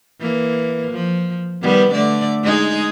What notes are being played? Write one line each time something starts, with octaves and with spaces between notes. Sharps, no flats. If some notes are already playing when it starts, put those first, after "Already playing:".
E3 A#3
F3
D#3 G3 B3
D3 A3 D5
G#3 D#4 G#4